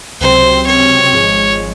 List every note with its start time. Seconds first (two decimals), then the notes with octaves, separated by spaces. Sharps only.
0.20 C#2 C3 F#3 C4 C5
0.67 C#5
1.12 G#1 G#2 F3 G#3